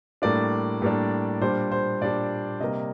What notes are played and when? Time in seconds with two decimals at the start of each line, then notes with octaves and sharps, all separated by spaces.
0.22 A2 G3 A#3 D4 D5
0.82 A2 G3 A#3 D4
1.41 A#2 G3 D4 C5
1.72 C5
2.01 A#2 G3 D4 D5
2.60 C3 G3 A#3 D#5